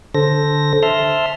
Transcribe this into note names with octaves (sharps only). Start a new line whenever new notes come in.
D3 A4 C5 A#6
E5 A5 C6 F6